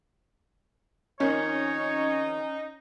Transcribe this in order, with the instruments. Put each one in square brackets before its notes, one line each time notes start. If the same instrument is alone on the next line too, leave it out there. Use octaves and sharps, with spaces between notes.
[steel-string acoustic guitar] F2 D#3 G#4 [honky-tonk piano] C#4 [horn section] D#4 D#5 [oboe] C#5